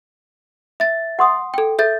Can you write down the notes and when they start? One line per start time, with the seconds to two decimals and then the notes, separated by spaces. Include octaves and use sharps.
0.80 E5 A6
1.19 F#5 C6 D#6
1.54 A4 G5
1.79 A4 E5 G6 A6